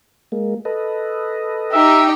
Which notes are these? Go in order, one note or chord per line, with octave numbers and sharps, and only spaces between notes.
G#3 A#3
A4 B4 D#5
D#4 G4 E5